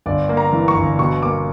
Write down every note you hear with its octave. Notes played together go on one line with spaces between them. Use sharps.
G1 D5
A#3
A#5
E3
C#6
G1
B2 C#6
A#3 D6